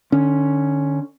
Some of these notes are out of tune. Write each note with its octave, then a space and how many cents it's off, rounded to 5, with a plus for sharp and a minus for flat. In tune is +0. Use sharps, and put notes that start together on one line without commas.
D3 +35 C#4 +5